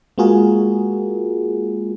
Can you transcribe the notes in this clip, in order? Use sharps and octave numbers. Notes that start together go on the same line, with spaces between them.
G#3 A#3 F4 F#4 G#4 A#4